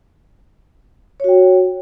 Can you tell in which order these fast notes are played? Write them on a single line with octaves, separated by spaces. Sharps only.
C#5 F#4 G5